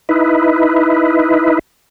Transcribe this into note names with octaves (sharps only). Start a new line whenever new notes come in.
D#4 E4 B4